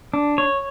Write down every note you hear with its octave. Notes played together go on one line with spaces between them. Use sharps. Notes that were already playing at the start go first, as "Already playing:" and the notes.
D4
C#5